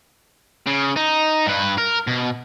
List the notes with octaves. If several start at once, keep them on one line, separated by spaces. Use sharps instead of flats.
C#3
D#4
G2 B4
A#4
B2